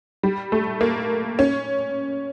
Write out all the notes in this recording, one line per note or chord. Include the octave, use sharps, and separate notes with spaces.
G3
A3
A#3
C#4